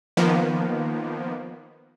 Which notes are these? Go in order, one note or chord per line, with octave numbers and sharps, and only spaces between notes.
D#3 F3 A#3 B3